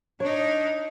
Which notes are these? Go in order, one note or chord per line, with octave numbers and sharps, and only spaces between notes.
D4 D#4 C#5